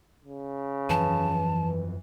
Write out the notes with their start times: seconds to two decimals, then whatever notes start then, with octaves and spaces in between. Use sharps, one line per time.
0.25 C#3
0.90 F#2 E3 F3 A5